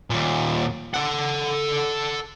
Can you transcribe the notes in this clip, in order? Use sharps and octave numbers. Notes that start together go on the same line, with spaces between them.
D#2 A#2
A4 F#5